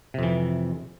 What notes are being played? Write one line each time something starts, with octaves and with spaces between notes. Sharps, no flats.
F2 C3 E3